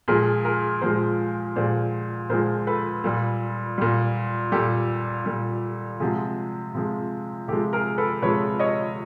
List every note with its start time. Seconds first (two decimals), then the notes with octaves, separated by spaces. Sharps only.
0.08 A#2 F3 G#3 G#4 A#4
0.45 G#4 A#4
0.81 A#2 F3 G#3 A#4 C5
1.56 A#2 F3 G#3 C5 D5
2.30 A#2 F3 G#3 A#4 C5
2.67 A4 B4
3.04 A#2 G3
3.78 A#2 G3
4.52 A#2 G3 G4 A4
5.26 A#2 G3
6.00 C3 F3 G#3 F#4 G#4
6.75 C3 F3 G#3
7.48 C3 F3 G#3 G4 A4
7.73 G#4 A#4
7.98 A4 B4
8.22 C3 F3 G#3 B4 C#5
8.59 C#5 D#5